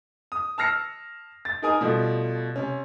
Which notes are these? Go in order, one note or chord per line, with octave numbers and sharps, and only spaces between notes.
D#6
A5 E6 F6 A#6 C7 C#7
A6
D#4 G#4 A#4 G#5 D#6
B2 F3 G3 A3
C3 C#4